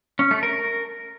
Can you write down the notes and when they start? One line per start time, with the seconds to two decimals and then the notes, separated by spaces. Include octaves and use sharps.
0.19 C#4
0.31 A3
0.43 A#4